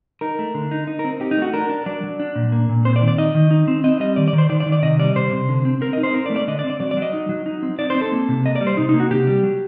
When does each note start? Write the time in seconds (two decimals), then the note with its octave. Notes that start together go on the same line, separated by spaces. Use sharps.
0.21 D#4 A#4
0.39 A3
0.55 D3
0.71 D#4
0.87 D#4
0.99 A#4
1.04 C4
1.20 D#4 G4
1.31 D#4
1.37 A3 F#4
1.53 D4 A#4
1.70 D4
1.86 F#3 D5
2.03 F#3
2.20 D4
2.36 A#2
2.52 A#3
2.69 A#2
2.85 C4 C5
2.96 D5
3.01 D#3
3.08 D5
3.18 D#4 D#5
3.35 D#3
3.51 D#4
3.68 C4
3.84 C4 D#5
4.00 G3 D#5
4.16 D#3 D5
4.28 D5
4.33 D#3
4.38 C5
4.49 D#3 D5
4.60 D5
4.66 D#3
4.72 D5
4.82 C3 D#5
4.99 G3 D5
5.16 C3 C5
5.31 C3
5.49 D3
5.65 C4
5.81 C4 A#4
5.93 D#4 D#5
6.03 C5
6.14 C4 A#4
6.26 D5
6.30 A3
6.36 D5
6.48 D3 D#5
6.59 D5
6.64 C4
6.70 D5
6.80 F#3 D5
6.91 D5
6.97 F#3
7.02 D#5
7.13 D#4
7.29 F#3
7.46 D#4
7.63 C4
7.79 D#4 D5
7.90 C5
7.95 C4
8.01 A4
8.12 A#3
8.29 C3
8.45 A#3 D#5
8.56 D5
8.61 G3
8.67 C5
8.77 C3 D#4
8.89 D#4
8.94 A#3
9.00 F#4
9.11 C3 G4
9.27 G3
9.43 F#3